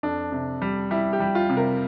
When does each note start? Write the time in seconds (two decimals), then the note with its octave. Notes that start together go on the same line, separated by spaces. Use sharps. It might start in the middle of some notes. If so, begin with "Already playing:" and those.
0.03 F2 D4
0.32 C3
0.62 G3
0.91 G3 E4
1.13 G4
1.20 G3
1.35 F4
1.50 C3
1.57 A#4